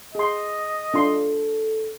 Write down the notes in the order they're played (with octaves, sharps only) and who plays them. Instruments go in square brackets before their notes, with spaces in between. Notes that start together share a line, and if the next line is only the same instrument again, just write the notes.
[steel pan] G#4 C6 [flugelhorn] D#5
[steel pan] D4 F4 C6 [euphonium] A4